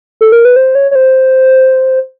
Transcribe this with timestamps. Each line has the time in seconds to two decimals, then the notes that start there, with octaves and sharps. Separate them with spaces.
0.21 A4
0.32 A#4
0.45 B4
0.56 C5
0.75 C#5
0.91 C#5
0.95 C5